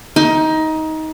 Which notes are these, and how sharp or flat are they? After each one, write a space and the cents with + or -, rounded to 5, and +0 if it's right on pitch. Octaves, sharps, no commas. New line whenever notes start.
D#4 +20